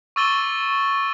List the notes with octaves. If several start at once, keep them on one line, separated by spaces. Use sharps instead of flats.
C#6 D6 E6 A6 D#7 G7